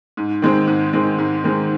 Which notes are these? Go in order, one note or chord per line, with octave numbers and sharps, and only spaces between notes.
G#2
D#3 G#3 C4
G#2
D#3 G#3 C4
G#2
D#3 G#3 C4